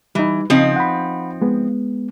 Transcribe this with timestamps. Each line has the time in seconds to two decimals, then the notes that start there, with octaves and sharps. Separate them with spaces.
0.15 E3 G3 D#4
0.50 C#3 F3 C4 D#4
0.76 F#5 B5
1.42 G#3 B3